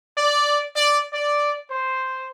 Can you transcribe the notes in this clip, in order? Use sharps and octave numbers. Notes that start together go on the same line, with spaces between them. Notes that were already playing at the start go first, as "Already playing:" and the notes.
D5
D5
D5
C5